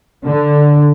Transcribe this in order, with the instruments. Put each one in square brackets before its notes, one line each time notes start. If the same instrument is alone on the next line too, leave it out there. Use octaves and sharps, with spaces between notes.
[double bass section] D3